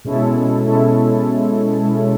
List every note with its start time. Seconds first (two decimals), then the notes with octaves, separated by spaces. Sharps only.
0.05 B2 G#3 C#4 E4 A4
0.66 B2 G#3 C#4 E4 A4